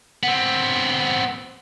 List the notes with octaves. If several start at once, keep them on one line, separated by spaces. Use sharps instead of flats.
B3 C4